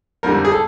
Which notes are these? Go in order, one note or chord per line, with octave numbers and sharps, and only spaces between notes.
F2 D3 G3 A#4
G#4
A4